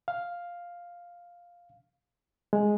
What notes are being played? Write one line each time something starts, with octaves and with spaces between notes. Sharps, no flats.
F5
G#3